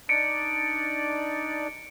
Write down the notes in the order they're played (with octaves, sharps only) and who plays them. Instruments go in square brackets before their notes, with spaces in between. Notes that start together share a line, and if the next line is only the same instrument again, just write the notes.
[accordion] D4 D#4 D5 [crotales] C#7 D7